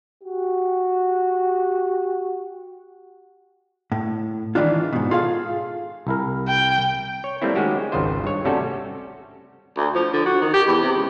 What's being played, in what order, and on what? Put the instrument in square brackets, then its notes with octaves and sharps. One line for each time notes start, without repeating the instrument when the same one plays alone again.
[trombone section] F#4 G4
[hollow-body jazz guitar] A2
D#3 E3 G#3 D4 F4
G#2 B2
F4 G#4 A4 F5
[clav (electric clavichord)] C2 E4 A#4
[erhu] G5
[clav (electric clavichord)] C#5
G3 A3 A#3 C4 E4
D#3 G#3 C#4 F#4 G4
G#1 C#2 D#3 F4 C5
G2 C#5
C3 G3 A3 C#4 F#4 A4
[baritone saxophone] D2
F3
D3
F#4
D#3
G4
E2
C3
C#2